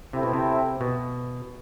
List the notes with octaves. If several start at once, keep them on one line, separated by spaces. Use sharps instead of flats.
C3 C4 E4 A4 E5 G5
B2
C3
B2